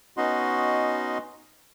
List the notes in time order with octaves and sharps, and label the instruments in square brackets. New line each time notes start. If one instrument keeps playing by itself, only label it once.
[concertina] B3 C#4 D#4 F#4 D#5 C6